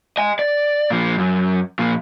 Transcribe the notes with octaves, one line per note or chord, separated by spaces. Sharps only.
D#5 G#5
D5
A#2 F3
F#2
A#2 F3